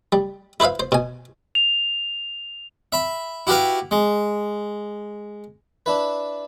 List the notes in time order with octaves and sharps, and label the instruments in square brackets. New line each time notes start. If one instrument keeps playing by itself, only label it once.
[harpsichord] G3
E4 B4 C5 E5 F5
C5
B2 G#5
[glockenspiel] F7
[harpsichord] E5 B5
E4 F#4 G4 B4 F5
G#3
D4 E4 B4